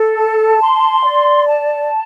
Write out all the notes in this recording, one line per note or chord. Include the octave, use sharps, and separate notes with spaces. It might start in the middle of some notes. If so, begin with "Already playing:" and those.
Already playing: A4
A5
C6
D5
A5